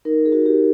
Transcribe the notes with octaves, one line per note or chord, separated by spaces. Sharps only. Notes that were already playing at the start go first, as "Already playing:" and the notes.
D#4 A#4
G#4
F#4
G4